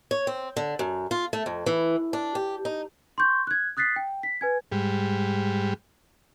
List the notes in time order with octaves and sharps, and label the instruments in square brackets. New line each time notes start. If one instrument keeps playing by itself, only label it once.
[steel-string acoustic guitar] C#5
C4
D3
F#2
F4
A3
F2
E3
D4
G4
D#4
[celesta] C6 C#6 G6
F#6 G#6
D#6 F#6 A6 B6 C7
G5
B6
B4 G#5 G#6
[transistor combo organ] G#2 G3